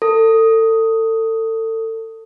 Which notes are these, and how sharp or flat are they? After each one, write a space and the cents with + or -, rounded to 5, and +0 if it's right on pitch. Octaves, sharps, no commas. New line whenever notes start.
A4 +30